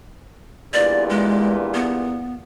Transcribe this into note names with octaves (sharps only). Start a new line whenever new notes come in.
E2 G2 A#2 D5
G#3
B3